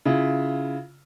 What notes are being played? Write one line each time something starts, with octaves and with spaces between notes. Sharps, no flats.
C#3 E4 F4